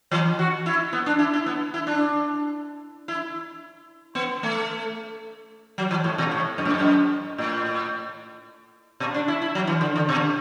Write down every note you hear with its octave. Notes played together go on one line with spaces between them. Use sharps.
E3
F#4
E4
B3
D4
E4
E4
B3
E4
D4
E4
B3
A3
F#3
E3
A2
B2
A2
F#2
A2
F#2
A2
B2
D4
E4
E4
F#3
E3
D3
D3
B2